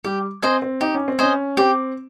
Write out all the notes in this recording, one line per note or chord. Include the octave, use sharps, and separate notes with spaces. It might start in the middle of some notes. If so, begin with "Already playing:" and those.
G3 G4
C4 C5 D#5 G#5
C4
D#4 G4
C#4
C4
C#4 C5 D#5 G#5
C4 G4